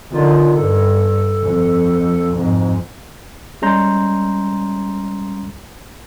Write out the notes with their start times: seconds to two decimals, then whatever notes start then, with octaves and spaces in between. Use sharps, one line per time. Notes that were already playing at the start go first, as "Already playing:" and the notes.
0.12 D3 D#3 F4
0.56 G2 A4
1.42 F2
2.34 F2 G#2
3.62 G3 G#3 C#4 A#5 C6 G6